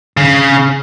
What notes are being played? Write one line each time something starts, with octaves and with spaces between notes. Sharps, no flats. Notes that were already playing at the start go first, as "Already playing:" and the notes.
C#3